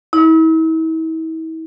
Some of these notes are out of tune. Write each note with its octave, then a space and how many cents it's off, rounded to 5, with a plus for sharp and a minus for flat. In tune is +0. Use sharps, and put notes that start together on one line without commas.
E4 -40